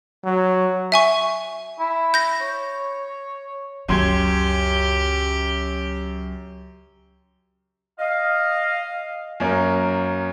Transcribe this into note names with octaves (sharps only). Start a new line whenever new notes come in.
F#3
E5 G#5 C#6
E4
G6 A#6
C#5
C#2 F#2 C#3 G4 C6 G#6
D#5 F5
F#2 A#3 C#4